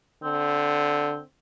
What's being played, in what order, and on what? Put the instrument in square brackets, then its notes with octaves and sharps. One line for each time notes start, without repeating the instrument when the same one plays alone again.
[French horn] D3 [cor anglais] C4